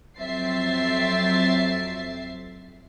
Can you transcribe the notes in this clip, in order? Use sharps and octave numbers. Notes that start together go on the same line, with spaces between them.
F2 F#3 C4 E5 A6 C7